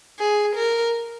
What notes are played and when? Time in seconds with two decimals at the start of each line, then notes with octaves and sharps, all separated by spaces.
0.19 G#4
0.56 A#4